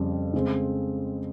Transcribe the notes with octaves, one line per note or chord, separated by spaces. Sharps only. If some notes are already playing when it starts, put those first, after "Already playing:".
Already playing: F2 C#3 G3 C#4
C#3 G#3 C4